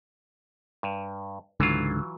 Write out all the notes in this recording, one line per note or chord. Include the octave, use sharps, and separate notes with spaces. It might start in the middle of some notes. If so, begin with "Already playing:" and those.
G2
C#2 G#2 D3 E3 F#3 F4